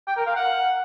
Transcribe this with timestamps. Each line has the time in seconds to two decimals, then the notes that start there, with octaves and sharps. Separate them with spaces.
0.07 G5
0.17 A#4
0.26 F5
0.36 F#5